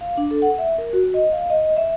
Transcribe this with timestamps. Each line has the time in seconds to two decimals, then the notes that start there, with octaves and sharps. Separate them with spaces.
0.01 F5
0.17 D4
0.31 A4
0.42 F#5
0.58 E5
0.78 A#4
0.93 F#4
1.14 D#5
1.32 F5
1.50 D#5
1.77 E5